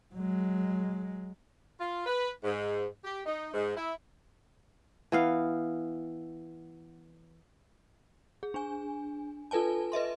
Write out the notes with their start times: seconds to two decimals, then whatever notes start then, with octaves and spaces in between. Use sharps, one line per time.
0.15 F#3 G#3
1.79 F4
2.06 B4
2.43 G#2
3.04 G4
3.25 D#4
3.53 G#2
3.76 E4
5.12 E3 B3 F5
8.43 G#4
8.54 D4 G#5
9.51 F4 A4 B4 G#5 A5
9.92 B4 D#5 E5 C6